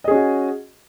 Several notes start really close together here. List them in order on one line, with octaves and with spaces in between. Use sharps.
D#5 G#4 C#4 F#4